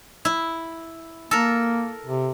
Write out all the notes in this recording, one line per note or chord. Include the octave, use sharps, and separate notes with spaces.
E4
A#3 A4 A#4
C3